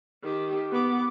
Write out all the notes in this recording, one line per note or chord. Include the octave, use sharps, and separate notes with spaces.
D#3 G4
B3 D6